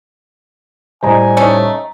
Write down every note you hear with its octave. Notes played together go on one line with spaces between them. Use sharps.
A2 G3 C5 D#5 G#5 A#5
A3 C#4 D#4